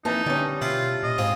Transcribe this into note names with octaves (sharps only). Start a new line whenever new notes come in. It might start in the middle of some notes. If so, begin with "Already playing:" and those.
F2 E3 A#3 D#4 A5
D3 G3 C#4
B2 E4 F4 G4 A5
A#2 D#5
G#2 C4 F4 G#4